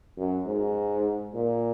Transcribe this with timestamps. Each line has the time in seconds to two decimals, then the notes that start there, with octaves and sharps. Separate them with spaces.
0.17 F#2
0.46 G#2
1.34 A#2